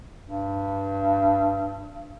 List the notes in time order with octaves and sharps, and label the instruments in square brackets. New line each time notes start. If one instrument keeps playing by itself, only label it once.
[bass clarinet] G2